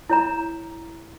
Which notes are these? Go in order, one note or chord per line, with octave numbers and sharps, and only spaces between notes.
E4 C#5 A#5